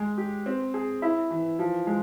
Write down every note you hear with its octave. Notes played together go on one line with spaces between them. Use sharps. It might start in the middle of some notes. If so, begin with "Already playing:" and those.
Already playing: G#3
G4
C4
G#4
E4
E3
F3
G#3